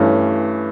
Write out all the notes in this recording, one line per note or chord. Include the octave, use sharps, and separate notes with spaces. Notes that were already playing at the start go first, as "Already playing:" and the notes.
Already playing: G2 E3 A3 C#4